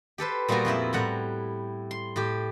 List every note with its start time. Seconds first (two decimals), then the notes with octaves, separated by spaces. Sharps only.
0.18 G4 A4 B4 C5
0.48 A#2 G3 A#3 B3 F#4
0.65 F2 F3 E4 E5
0.93 A2 G3 F#5 A#5
1.91 C6
2.16 A2 G4